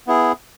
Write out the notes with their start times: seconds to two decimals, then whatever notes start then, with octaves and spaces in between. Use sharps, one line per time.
0.07 B3 E4 G#4